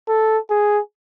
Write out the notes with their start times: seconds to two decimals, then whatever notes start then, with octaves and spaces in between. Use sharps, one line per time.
0.08 A4
0.50 G#4